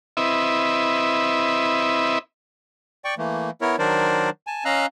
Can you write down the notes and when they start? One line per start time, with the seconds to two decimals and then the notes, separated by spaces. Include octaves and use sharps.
0.17 C4 E4 B4 D#5 E5
3.05 D5 G5 C#6
3.18 E3 A3 A#3
3.61 B3 E4 A#4 C#5
3.79 D#3 F#3 D4 A#4 C5 D5
4.47 G#5 A5
4.65 C#4 D#5 F5 A#5 E6 F#6